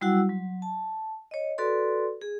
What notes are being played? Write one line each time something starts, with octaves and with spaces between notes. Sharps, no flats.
F#3 G3 E4 F#4 F#5 E6
F#3
A5
C#5 D#5
F#4 A4 B4 D5 C6
G#4